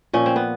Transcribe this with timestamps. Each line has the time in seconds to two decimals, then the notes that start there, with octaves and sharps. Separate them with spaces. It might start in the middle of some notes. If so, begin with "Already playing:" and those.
0.13 A#2 F3 C#4
0.26 C4
0.36 B3